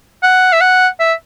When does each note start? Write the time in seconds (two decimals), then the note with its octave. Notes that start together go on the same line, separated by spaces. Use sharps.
0.23 F#5
0.53 E5
0.61 F#5
1.00 E5